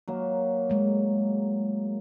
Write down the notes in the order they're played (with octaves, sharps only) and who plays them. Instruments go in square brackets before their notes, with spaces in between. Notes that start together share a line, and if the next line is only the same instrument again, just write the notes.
[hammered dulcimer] F#3 A#3
[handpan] G#3 A3